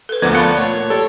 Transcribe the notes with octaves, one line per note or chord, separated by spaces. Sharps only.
A4 B4
D2 F3 A#3 B3 D5 D6 G#6
A3 F5 A5 B5 F#6 C#7
A#2 A3 C#5
G3 A4